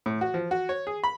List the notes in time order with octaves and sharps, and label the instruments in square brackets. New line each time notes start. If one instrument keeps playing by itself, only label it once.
[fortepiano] A2
F#4
F3
F#4
C#5
G#4
B5